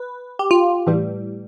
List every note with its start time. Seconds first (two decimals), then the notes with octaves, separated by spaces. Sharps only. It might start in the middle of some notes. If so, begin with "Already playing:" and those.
Already playing: B4
0.39 G4
0.51 F4
0.87 A2 E3 G3